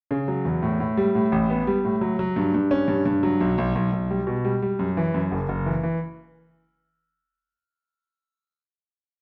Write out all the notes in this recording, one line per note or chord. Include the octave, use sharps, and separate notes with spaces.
C#3
F#3
E2
A2
A2
G3
A2
A1
B3
G3
A2
F#3
F#3
G2
G2
C#4
G2
G2
F#3
B1
B1
B1
B1
G3
B2
G3
G3
F#2
E3
F#2
F#1
F#1
E3
E3